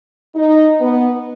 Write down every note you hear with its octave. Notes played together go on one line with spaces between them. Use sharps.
D#4
B3